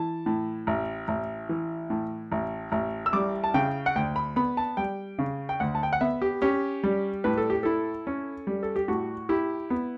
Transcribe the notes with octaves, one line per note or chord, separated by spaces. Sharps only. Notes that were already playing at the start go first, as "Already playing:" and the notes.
Already playing: E3 A5
A2
A1
A1
E3
A2
A1
A1
E6
G3 D6
A5
C#3 G5
F#5
D2 G5
B5
B3 B5
A5
G3 G5
C#3
G5
D2 F#5
A5
G5
F#5
B3 E5
G4
C#4 G4
G3
A2 B4
A4
G4
E4 A4
C#4
G3
A4
G4
A2 F#4
E4 G4
B3